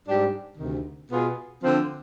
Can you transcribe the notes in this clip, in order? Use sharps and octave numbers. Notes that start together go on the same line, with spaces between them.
G#2 G3 D4 G4
D2 C3 D#3
B2 B3 F4 G#4
D3 F3 C4